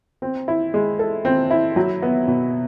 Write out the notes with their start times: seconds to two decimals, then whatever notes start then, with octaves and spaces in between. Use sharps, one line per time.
0.22 C4
0.48 E4
0.74 G#3
0.99 A4
1.25 C4
1.51 E4
1.76 F#3
2.02 B3
2.28 B2